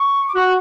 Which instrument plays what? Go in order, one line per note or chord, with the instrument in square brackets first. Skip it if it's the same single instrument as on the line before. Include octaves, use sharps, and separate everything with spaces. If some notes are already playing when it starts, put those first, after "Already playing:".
Already playing: [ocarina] C#6
D6
[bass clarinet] F#4 [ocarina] C#6